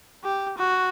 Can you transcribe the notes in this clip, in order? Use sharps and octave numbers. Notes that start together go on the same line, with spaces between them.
G4
F#4